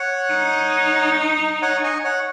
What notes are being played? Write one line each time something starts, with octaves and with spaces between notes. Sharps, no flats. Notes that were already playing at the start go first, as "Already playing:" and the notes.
Already playing: C#5 F#5
D#4
C#5 F#5
D#5 G#5
C#5 F#5